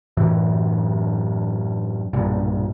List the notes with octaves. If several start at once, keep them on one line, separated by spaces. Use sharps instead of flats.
F#2 A2 E3 F#3
B1 G2 A#2